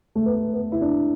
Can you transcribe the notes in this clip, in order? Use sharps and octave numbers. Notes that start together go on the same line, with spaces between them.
A3
B3
B3
E4
D4